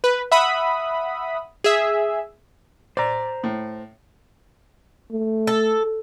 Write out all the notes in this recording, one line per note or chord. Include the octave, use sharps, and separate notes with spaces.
B4
E5 F#5 B5 D#6
G#4 E5
C5 D5 A#5
A2
A3
A4